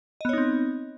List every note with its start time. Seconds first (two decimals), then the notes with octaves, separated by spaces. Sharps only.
0.21 D#5
0.25 B3
0.29 C#5
0.33 D#4
0.38 C4